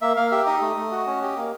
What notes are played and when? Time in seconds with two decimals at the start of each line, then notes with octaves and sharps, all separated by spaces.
0.02 A#3 E5
0.16 A#3 F5
0.32 G4 E5
0.46 D#4 D#5
0.61 A3
0.77 A3
0.92 F#4
1.07 C#4
1.22 G4
1.36 A#3